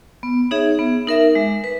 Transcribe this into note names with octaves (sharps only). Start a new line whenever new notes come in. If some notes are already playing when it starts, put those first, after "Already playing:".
B3
D#4 G#4 C#5 E5
B3
D#4 A#4 E5
G#3
B4